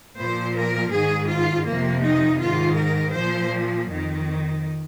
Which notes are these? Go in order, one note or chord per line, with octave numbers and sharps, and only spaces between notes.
A#2 F3 C5
A#4
G#2 D#3 G#4
F4
F2 C3 F3 A#3
D#4
G#2 D#3 F4
A#4
A#2 F3 C5
F2 D#3